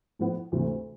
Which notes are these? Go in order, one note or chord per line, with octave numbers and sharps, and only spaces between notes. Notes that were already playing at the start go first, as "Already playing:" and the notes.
A2 F3 B3 E4
D2 C3 E3 A3